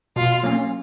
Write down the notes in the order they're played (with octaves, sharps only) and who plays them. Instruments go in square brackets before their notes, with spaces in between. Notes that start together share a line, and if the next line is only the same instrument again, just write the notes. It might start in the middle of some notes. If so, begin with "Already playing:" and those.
[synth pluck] B2 [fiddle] F4
[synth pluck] F#3 A#3 C#4